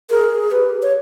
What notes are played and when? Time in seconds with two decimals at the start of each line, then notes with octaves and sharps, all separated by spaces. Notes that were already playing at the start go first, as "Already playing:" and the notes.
0.10 G#4 A#4
0.51 G4 B4
0.82 C#5